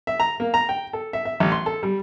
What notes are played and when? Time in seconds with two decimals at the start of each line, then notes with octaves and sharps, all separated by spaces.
0.07 E5
0.20 A#5
0.40 A#3
0.54 A#5
0.69 G5
0.93 A4
1.13 E5
1.25 E5
1.40 A1
1.52 C6
1.66 A4
1.83 G3